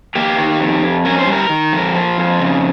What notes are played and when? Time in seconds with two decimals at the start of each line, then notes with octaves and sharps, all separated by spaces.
0.15 A#3 G4
0.38 D#3
0.60 F2
0.82 F2
1.05 C#4 A#4
1.19 C5
1.27 G3
1.32 A#4
1.50 D#3
1.72 F2
1.94 F3
2.18 F2
2.39 C#3